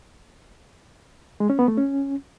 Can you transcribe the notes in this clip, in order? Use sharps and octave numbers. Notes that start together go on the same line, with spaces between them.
G#3
C#4
B3
A3
C#4